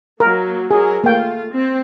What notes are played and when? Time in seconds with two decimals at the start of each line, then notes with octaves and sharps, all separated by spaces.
0.20 F#3 A#3 A#4
0.71 F#3 G#4 A#4
1.04 A3 A#3 F4 G5
1.51 C4